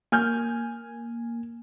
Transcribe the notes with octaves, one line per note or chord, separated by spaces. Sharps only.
A#3 G#5 F6 G6